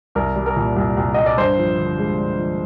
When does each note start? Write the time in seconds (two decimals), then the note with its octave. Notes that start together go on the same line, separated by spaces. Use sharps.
0.15 C2 A#4
0.35 G3
0.46 A#4
0.56 A#2
0.76 C2
0.97 C2
1.14 G3 D#5
1.26 D5
1.38 G2 C5
1.58 F3
1.77 D3
1.98 G#3
2.19 G2
2.38 F3